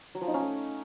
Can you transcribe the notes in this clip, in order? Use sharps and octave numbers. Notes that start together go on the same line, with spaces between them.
F#3
F3
D#4
C#4
A3